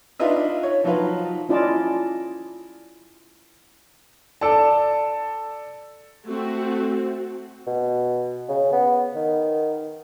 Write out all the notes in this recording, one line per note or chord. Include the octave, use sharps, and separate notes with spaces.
D4 D#4 F4 B4 D#5 E5
C#5
F3 F#3 D#4 F4 B4
C#4 E4 F4 D5 D#5 A5
A4 D5 A5
A3 C4 F#4
B2
C#3
B3
D#3